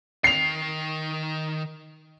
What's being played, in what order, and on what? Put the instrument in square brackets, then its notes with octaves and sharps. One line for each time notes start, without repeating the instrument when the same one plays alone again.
[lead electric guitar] D#3 G5 [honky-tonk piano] C7 F7